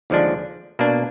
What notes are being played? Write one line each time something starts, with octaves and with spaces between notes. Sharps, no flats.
D#2 D3 F3 G#3 D4
B2 A#3 D4